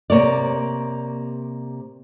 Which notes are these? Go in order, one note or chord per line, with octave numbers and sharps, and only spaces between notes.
C3 A#3 C#5 D5